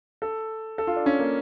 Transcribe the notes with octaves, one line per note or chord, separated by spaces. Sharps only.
A4
A4
F4
D4
C#4
A#3